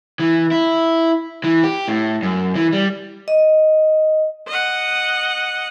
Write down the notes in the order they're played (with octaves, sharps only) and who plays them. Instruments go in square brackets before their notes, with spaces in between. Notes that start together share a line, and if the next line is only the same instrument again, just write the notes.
[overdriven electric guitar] E3
E4
E3
G4
A2
F#2
E3
G3
[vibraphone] D#5
[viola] D#5 F#5